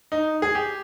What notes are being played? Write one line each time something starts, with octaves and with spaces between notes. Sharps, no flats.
D#4
G#4
G4